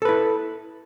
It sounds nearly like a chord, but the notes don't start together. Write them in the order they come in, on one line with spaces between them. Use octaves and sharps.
A4 B4 E4